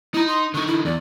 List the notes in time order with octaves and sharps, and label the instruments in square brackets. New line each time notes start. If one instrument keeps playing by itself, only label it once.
[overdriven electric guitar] D#4 A#5 [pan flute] E4
[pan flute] C6
[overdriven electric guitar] D3 D#4 [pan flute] C#6
[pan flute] E4
[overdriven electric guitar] E2 [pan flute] D5